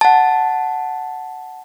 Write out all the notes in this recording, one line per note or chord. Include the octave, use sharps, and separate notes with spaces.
F#5 A5